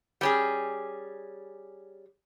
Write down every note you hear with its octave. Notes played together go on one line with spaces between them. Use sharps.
G3 C#4 G#4